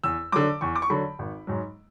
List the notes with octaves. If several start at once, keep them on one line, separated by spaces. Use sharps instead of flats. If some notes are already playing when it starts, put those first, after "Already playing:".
E2 E6
D3 F#3 D6
E2 C#6
D6
C#6
D3 F#3 B5
G#1
G#2 F#3